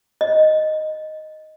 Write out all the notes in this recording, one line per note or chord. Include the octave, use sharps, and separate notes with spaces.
D#5